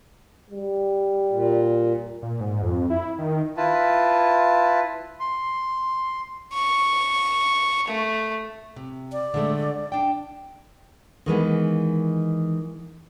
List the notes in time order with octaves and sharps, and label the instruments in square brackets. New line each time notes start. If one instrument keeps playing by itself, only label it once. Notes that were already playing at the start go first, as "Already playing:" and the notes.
[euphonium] G3
[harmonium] A#2
[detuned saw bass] A#2
G#2
F2
E4
D#3
[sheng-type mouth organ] E4 F4 B4 A5
C6
[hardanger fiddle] C#6
A3
[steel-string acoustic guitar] C3
[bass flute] D5
[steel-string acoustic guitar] D3 G#3 A3
D4 G5
[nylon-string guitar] D#3 E3 G#3 B3